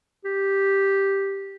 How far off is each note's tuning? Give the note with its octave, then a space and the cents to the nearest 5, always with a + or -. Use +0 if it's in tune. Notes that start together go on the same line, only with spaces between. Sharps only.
G4 +0